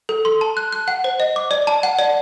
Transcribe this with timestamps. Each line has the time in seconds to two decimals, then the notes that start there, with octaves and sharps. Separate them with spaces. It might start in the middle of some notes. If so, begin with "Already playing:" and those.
0.09 A4
0.25 C6
0.41 A5
0.57 F#6
0.72 F#6
0.88 F#5
1.04 C5
1.20 D#5
1.36 D6
1.51 D5
1.67 A5
1.83 F#5
1.99 D5